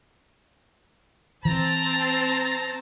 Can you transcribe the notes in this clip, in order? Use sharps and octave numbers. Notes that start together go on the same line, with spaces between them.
E3 C4 C5 A5 A#5